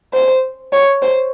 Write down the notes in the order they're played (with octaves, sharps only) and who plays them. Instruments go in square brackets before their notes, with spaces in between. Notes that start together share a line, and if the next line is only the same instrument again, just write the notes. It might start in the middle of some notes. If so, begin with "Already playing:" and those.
[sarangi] C5
C#5
C5